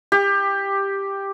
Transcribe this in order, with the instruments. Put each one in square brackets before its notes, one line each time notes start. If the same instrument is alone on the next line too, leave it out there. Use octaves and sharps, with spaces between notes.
[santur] G4